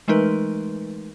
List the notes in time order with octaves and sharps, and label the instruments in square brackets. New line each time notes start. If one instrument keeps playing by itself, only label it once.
[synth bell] E3 G#3 A3 D#4 A#4 B4